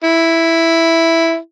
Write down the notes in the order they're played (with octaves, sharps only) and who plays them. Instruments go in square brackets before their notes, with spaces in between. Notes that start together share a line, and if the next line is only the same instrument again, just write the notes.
[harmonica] E4